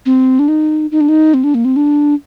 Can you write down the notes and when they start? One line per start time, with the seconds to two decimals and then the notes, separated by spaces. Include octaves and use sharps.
0.06 C4
0.39 D4
0.48 D#4
0.91 D#4
1.01 D4
1.09 D#4
1.34 C4
1.44 D4
1.54 A#3
1.65 C4
1.76 D4